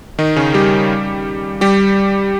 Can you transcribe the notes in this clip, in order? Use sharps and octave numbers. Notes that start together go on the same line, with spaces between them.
D#3 D#4
C#3 C#4
G3 G4
G3 G4